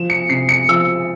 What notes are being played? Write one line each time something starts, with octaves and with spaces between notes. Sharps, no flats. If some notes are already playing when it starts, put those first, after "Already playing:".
Already playing: F3 E7
C#7
C3 C7
C#7
F3 E6